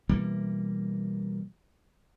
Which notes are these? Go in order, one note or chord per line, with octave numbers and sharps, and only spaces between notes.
B2 E3 G3 A#3